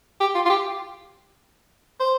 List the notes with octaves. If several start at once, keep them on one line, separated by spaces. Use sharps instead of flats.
G4
F4
F4
G4
C5